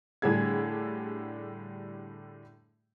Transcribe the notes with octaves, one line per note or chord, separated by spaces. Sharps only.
A2 D3 G3 D4 G#4 G#6